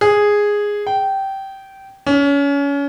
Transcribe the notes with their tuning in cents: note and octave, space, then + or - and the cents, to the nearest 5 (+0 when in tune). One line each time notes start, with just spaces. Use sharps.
G#4 -5
G5 -15
C#4 +30